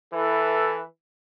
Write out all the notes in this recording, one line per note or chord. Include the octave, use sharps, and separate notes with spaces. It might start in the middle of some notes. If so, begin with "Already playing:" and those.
E3 E4 A4 B4